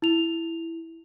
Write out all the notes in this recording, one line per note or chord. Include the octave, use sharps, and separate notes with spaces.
E4 F7